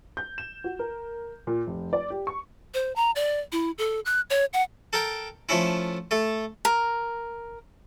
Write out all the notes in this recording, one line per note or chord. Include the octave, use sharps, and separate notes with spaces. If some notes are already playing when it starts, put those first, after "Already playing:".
G6
E7
F#4
A#4
A#2
F1
D5
G4
C#6
C5
A#5
D5
E4
A4
F#6
C#5
F#5
A4 A#4 G5
F3 A3 C#4 E4
A3 A4
A#4